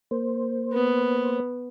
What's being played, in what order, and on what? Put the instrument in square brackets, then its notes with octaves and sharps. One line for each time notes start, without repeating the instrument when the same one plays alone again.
[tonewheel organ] A#3 C5
[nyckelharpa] B3